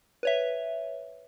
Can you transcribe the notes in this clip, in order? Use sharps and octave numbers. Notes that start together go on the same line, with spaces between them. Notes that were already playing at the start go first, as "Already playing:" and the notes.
B4 C#5 E5